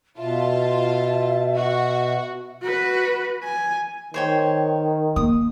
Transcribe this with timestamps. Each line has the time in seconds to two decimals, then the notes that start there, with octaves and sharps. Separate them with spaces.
0.18 B2 F4 E5 A5
1.56 F#4
2.63 F#4 B4
3.44 G#5
4.14 D#3 C5 C#5 G5
5.16 A#3 D#6